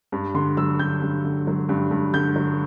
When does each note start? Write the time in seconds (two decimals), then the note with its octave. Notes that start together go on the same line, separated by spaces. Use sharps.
0.12 G2
0.34 D3 C6
0.57 F#3 E6
0.80 G2 G6
1.02 G2
1.24 D3
1.47 F#3
1.69 G2
1.91 G2
2.14 D3 G6
2.36 F#3